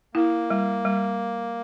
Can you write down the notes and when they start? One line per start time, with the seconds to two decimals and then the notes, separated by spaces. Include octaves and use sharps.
0.15 A#3 E4
0.50 G3
0.85 G3